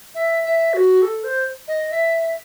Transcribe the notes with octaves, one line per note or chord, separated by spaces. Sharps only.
E5
E5
F#4
A4
C5
D#5
E5